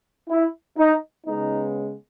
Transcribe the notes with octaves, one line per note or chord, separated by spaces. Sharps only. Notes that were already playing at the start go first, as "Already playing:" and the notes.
E4
D#4
C#3 G#3 B3 D#4